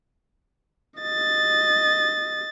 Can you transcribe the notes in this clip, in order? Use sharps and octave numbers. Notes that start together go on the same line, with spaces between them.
D#5 A6